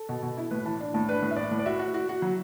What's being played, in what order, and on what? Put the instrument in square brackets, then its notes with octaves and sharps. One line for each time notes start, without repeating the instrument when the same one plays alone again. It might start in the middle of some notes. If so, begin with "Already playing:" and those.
Already playing: [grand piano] A4
[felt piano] B2
B2
E4
[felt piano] A2 [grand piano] B4
[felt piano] E3 [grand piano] A5
[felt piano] D4
[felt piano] A2 [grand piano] A5
[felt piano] D4 [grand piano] B4
[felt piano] A2
[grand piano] E5
[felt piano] A2 [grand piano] D5
[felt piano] A2
[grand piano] D5
[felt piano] F#4 [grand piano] E5
[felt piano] F#4
F#4
F#4
F#3